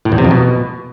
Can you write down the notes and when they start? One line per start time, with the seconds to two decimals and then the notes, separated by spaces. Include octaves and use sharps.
0.05 A2
0.12 E2
0.18 C3
0.25 F2
0.31 B2